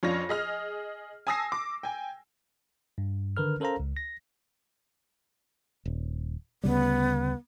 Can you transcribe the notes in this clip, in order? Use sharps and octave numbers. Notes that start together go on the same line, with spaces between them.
F2 C#4 D4 F4 C#5 A#6
G#4 D#5 F6
G#5 A5 D#6 E6 A#6 C7
D6
G5 G#5
G2
D3 D#3 A#4 B4 F6
C#4 A4 A#4 C5 F5 A#5
C#2
A#6
D#1
D2 C#3 G3 B3